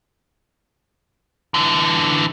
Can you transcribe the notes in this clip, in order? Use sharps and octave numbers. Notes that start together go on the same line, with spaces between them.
D3 E3